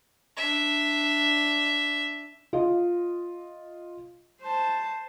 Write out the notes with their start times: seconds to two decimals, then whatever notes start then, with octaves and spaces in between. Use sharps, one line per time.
0.37 D4 E5
2.53 F4 D#5 F5
4.42 C5 A5